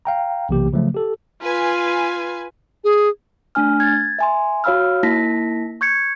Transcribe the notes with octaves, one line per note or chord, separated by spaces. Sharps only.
F5 G5 A#5
B1 C3 E3 A#3 G4
C#3 F3 F#3 A3
G4 A4
F4 B4 G#5
G#4
A3 D4 G#5 F6
G#6 A6
E5 G#5 C6
F#4 C#5 F5 B5 E6 F6
A#3 D#4 E4 A5 A#6 B6
C#6 G6 G#6 C#7